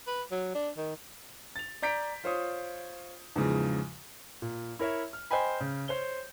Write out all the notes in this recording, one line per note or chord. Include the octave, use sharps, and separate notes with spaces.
B4
F#3
D4
D#3
A6 F7
D5 A#5 G6 B6 D7
F4 C5 C#5 D#6
E2 G#2 C#3 F3
A#2
E4 A#4 C#5 E5
F6
C5 D#5 G5 G#5 B5
C#3
C5 C#5 G7